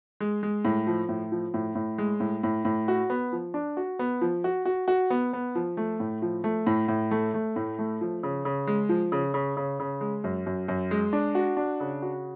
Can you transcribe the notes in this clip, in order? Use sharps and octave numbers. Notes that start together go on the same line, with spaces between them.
G#3
G#3
A2
F3
A2
F3
A2
A2
G#3
A2
A2
A2
F#4
B3
F3
D4
F#4
B3
F3
F#4
F#4
F#4
B3
B3
F3
A3
A2
F3
A3
A2
A2
A3
A3
A2
A3
F3
C#3
C#3
G#3
F3
C#3
C#3
C#3
C#3
G#3
F#2
F#2
F#2
G#3
D4
F#4
D4
C#3
F#4